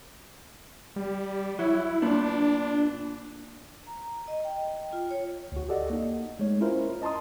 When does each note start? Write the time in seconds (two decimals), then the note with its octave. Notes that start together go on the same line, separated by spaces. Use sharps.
0.96 G3
1.59 F#3 E4
2.02 A#2 B3 D4
3.87 A#5
4.28 D#5
4.45 G5
4.93 F4
5.11 C#5
5.52 D2 F#4
5.69 G4 A4 D5 D#5 F#5
5.90 A#3 D#4
6.39 G#3 A3 C#5
6.61 C#4 E4 F4 A#4 C5
7.02 D#5 A5 A#5 C6 D#6